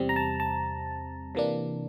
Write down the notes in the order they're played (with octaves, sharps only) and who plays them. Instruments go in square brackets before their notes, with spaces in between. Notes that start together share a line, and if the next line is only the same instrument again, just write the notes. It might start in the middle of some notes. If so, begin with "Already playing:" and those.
Already playing: [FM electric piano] E2 C3 G3 C4
A#5
A5
A5
C3 E3 A#3 D4